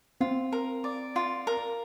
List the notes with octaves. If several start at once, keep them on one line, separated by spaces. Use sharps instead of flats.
C4 F4
A#4
D5
F4
A#4